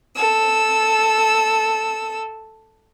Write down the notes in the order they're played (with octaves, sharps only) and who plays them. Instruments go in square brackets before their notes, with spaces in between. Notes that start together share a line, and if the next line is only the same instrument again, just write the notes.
[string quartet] A4 E6